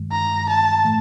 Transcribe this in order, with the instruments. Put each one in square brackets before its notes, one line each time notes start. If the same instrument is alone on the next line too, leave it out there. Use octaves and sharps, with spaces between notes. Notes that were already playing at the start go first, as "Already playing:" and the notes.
Already playing: [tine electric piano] G2 D#3 G#3
[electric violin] A#5
A5
[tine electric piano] A2 E3 A3